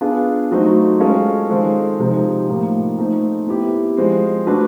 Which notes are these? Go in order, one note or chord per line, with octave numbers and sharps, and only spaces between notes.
B3 D4 F4 G#4
F#3 A3 C4 D#4 F#4
G#3 C#4 F4 A4 C#5
D#3 G#3 C4 F4 A4
C3 F3 G#3 C4 D#4
A2 F3 A#3 D#4
A3 C4 D#4
B3 E4 G4
F3 G#3 C4
A3 D4 F#4 B4